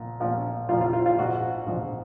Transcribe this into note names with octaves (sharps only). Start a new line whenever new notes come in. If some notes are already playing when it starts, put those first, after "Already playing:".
Already playing: A#1 A#2 F3
A#1 A#2 F3
A#1 A#2 F3 F4
F4
F4
F4
A#1 G#2 F3 F#4
A#1 G#2 F3